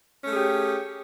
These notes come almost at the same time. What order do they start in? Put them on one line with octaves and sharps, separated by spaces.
C#4 A3 G#4 G4